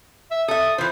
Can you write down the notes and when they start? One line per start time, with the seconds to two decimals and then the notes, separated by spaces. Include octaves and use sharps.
0.31 E5
0.48 A4 E5 D#6
0.78 E3 F3 C5